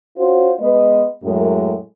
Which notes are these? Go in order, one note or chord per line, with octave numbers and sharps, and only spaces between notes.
C#4 F4 F#4 C5
G#3 B3 B4 D#5
F#2 A2 G#3 A#4